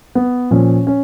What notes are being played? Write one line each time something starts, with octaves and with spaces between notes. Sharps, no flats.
B3
A#2 F3 C#4
C#4